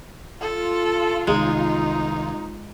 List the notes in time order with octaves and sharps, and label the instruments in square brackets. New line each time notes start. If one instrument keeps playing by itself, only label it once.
[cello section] F4 [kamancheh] A4
[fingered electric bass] C2 D#3 [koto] G#3 [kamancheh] D#4